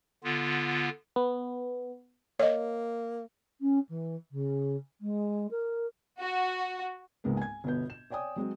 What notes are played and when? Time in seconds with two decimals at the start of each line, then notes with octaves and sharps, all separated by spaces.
0.24 D3 B3 F4
1.16 B3
2.40 A#3 C#5 D#5
3.61 C#4
3.89 E3
4.31 C#3
5.01 G#3
5.51 A#4
6.20 F#4
7.24 C#2 G#2 G#3 A#3 B3
7.37 G#5 G#6
7.64 G1 B2 B3 G6
7.90 E7
8.10 C#5 D5 G5 G#5 D#6
8.36 F#3 G#3 C4